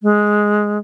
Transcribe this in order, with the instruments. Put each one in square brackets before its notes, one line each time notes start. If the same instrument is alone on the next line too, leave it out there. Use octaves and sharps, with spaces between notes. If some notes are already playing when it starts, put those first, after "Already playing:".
[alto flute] G#3